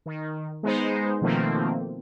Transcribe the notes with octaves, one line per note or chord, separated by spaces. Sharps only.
D#3
G#3 B3 D#4 C5
B2 D#3 F3 A3 A#3 C4